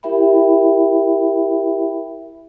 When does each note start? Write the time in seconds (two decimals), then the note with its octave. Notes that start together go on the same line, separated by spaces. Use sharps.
0.03 E4 G4 A#4 E5 G5 B5